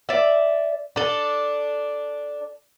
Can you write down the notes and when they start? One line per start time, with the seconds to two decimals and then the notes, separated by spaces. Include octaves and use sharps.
0.09 D5 E5
0.96 D4 A4